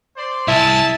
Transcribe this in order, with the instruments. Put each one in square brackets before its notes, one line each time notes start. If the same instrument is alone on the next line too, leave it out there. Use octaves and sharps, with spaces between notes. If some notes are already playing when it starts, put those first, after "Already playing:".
[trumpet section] C5 D5 C6
[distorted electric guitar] C2 [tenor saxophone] E4 [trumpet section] G#4 A5